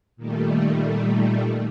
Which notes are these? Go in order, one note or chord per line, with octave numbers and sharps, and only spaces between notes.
A#2 D#3 G3 A3